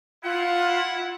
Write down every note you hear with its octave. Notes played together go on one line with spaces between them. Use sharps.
E4 F4 F#5